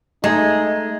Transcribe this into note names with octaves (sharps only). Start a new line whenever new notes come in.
G#3 A3 D#4